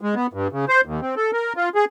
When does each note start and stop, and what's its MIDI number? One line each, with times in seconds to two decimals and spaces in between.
0.01 0.15 56
0.15 0.27 59
0.33 0.48 43
0.52 0.65 49
0.69 0.81 72
0.85 1.00 39
1.01 1.15 60
1.16 1.31 69
1.33 1.53 70
1.57 1.69 65
1.75 1.85 68